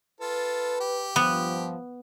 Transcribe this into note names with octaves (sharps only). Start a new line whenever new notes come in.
F4 A4 B4
G4
G2 F3 B3